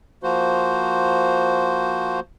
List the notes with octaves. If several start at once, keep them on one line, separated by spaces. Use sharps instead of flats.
F3 A#3 F#4 C5